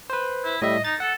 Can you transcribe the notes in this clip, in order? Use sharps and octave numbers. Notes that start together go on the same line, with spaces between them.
B4 C5
E4
A2 G3 D#5 E5
D#4 A6
A4 F#5